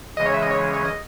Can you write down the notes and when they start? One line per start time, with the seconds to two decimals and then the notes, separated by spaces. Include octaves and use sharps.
0.17 C#3 E3 G#3 C#4 D#5
0.26 C#5
0.34 E5
0.42 D#5
0.51 C#5
0.73 C#5
0.85 D#5